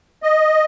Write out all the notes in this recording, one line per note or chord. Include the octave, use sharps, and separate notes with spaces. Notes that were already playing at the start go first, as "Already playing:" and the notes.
D#5